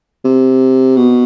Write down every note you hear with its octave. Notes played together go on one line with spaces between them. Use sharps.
C3
B2